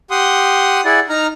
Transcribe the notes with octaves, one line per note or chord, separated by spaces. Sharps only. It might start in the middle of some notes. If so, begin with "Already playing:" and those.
G4 F#5 C6 D#6
E4 G#4 D5 F#5
D#4 A#5 F6